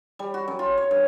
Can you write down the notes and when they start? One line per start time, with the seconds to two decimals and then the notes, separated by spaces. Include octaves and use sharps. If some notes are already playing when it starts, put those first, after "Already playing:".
0.19 G3
0.34 F#4
0.48 F#2
0.59 F4
0.78 C#5
0.91 G2